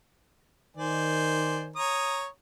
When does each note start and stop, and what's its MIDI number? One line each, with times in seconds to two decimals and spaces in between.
0.77 1.77 51
0.77 1.66 72
0.77 1.66 74
0.77 1.66 80
1.76 2.26 73
1.76 2.26 82
1.76 2.26 87